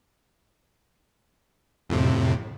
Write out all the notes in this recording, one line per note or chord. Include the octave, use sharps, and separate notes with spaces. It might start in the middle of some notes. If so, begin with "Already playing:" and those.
F2 A2 C3